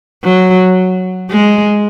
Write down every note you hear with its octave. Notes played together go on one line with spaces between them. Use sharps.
F#3
G#3